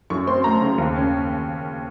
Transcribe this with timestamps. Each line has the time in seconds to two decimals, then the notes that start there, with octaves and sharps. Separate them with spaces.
0.10 F#2 C#6
0.27 C4 C6
0.44 A3 A#5
0.61 C#3
0.78 D#2
0.96 C#4